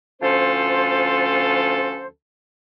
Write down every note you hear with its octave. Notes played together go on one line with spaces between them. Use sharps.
D2 F3 C#4 F4 A4 C5